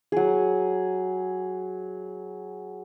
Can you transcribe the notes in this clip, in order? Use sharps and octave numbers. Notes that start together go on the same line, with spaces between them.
F#3 G#4